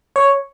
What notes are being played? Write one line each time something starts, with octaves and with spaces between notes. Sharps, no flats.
C#5